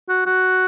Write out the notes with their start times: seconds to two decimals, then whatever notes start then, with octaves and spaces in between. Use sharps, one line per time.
0.09 F#4
0.26 F#4